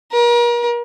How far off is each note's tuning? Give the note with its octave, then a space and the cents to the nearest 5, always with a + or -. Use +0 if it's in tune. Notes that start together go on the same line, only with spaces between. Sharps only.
A#4 +40